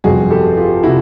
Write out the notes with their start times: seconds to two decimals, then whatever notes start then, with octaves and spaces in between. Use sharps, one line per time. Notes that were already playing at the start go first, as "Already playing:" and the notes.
0.04 G1 F2 C3 F#4 G#4
0.30 G4 A4
0.57 F4 G4
0.83 C3 E4 F#4